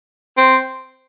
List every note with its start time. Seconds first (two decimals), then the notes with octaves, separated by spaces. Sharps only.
0.37 C4